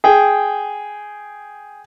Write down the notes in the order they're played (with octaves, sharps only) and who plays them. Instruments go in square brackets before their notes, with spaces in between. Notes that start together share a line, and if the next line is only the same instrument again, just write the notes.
[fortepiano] G#4 G5